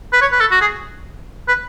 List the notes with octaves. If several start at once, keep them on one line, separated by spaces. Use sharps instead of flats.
B4
C#5
B4
A4
F#4
G#4
B4